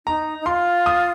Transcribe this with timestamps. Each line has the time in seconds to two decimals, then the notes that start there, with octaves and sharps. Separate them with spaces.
0.07 D#4 A#5
0.41 D#4
0.46 F4 C6
0.86 D#6